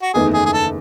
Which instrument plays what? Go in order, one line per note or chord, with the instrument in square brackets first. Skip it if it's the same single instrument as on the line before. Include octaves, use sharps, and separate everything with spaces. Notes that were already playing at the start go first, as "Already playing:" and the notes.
[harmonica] F#4
[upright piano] F#1 E2 D#3 A3 D#4 [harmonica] G#4
[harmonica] G#4
G#4
A4